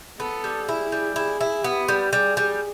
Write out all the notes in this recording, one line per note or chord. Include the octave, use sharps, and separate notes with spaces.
B3 A4
G3
E4 G#4
G3
E4 G#4
E4
B3 G4
G3
G3 G#4
G3